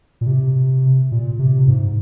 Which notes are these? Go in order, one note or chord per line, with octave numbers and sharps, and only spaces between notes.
A#2
C3
A#2
C3
G#2